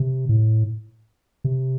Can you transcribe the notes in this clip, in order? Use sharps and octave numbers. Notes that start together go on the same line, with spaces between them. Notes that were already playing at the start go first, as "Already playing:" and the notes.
Already playing: C3
A2
C3